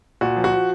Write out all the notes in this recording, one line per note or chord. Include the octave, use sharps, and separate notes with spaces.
A#2 F#4
F3
F#4
F3